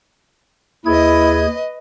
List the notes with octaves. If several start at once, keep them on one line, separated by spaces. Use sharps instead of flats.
D#2 E4 G#4 B4 D#5 G#6